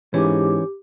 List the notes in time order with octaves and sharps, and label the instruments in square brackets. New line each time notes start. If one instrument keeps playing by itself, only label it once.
[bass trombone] G#2 [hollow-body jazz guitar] E3 C#4 [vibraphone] G4 D6